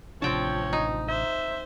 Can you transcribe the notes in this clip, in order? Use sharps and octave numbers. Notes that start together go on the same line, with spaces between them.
A1 C3 F3 C4 D4 C#5 G5 A5
D#4
C5 E5